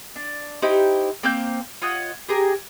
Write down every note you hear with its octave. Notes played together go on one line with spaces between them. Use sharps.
D4
D#4 E4 G4 C5
A#3 C4 F5 G6
F4 C#5 D#5 F#5
G4 G#4 A#4